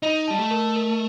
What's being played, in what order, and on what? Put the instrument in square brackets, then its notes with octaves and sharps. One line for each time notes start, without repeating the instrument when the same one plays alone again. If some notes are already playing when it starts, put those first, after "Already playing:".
[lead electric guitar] D#4 [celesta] D#5
[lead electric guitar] G3 [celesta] A5
[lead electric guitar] A3
[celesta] A#4
A#4